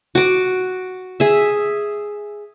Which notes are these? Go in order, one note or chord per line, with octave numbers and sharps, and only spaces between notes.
F#4 D6
G#4 E5